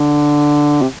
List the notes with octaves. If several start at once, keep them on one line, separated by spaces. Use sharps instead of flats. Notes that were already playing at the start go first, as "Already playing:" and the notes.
Already playing: D3
C3